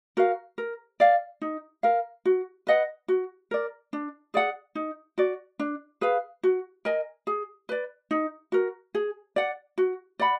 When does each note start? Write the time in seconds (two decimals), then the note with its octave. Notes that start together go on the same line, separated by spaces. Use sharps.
0.17 F#4 A#4 F5
0.58 A#4
1.00 D5 F5
1.41 D#4
1.83 A#4 F5
2.25 F#4
2.67 B4 D#5 F#5
3.08 F#4
3.51 A#4 D5
3.93 D4
4.34 G#4 D5 F#5
4.75 D#4
5.18 F#4 D5
5.59 D4
6.01 G#4 B4 F5
6.43 F#4
6.85 A#4 D#5 G#5
7.27 G#4
7.69 B4 D5
8.11 D#4
8.52 F#4 A#4
8.95 G#4
9.36 D5 F#5
9.78 F#4
10.19 D5 F#5 B5